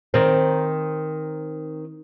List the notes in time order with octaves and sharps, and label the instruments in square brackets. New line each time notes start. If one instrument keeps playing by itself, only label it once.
[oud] D#3 C4